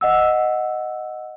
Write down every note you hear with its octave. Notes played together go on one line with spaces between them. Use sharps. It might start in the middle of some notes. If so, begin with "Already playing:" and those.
D#5 F#5 E6